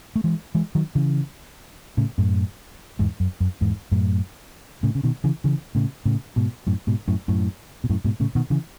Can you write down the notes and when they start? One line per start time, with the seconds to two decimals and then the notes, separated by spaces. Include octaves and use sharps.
0.16 A3
0.24 E3 G#3
0.55 E3 G#3
0.75 D#3 F#3
0.95 C#3 E3
1.97 A2 C#3
2.18 F#2 A2
2.99 E2 G#2
3.20 F#2
3.40 F#2
3.61 E2 G#2
3.91 F#2 A2
4.83 A2 C#3
4.95 C#3
5.04 B2 D#3
5.24 C#3 E3
5.44 C#3 E3
5.75 A2 C#3
6.05 A2 C#3
6.36 G#2 B2
6.67 F#2 A2
6.87 G#2 B2
7.08 F#2 A2
7.28 F#2 A2
7.84 B2
7.90 F#2 A2
8.04 G#2 B2
8.20 A2 C#3
8.35 B2 D#3
8.50 C#3 E3